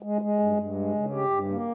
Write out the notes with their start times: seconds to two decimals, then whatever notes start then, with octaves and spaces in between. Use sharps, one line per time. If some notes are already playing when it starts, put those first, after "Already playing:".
0.03 G#3
0.22 G#3
0.39 G2
0.57 G2
0.75 G#3
0.94 C#3
1.12 G4
1.30 G2
1.49 A#3